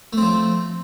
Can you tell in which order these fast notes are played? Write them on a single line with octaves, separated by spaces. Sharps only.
A3 C4 F3